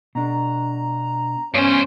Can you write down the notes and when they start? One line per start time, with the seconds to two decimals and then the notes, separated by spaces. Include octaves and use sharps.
0.15 B2 D4 A#5
1.54 G2 B3 C#4 C5